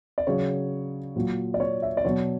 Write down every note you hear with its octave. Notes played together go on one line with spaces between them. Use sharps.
D5
C#3 F#3 C#5
A#2 F#3
D5
C#5
E5
D5
B2 F#3 C#5